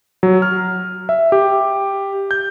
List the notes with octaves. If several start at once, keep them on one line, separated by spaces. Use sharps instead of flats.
F#3
F6
E5
G4
G6